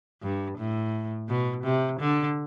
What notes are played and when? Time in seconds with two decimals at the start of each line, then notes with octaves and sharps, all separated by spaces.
0.23 G2
0.58 A2
1.29 B2
1.64 C3
2.00 D3